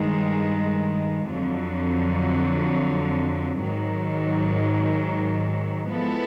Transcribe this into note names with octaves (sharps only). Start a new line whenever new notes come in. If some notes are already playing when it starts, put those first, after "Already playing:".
Already playing: G2 D#3 G#3
F2 D3 F#3
G#2 D#3 F#3
F3 G#3 B3 E4 A4